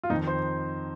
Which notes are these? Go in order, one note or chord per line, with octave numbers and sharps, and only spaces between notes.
F4
F2 D#3 D#4
C5